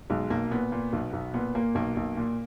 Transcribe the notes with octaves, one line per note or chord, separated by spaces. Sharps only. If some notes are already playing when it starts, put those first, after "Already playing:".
B1 G#3
B1 A#3
A#2 B3
A#2
B1
B1
A#2 B3
A#2 A#3
B1 A#3
B1
A#2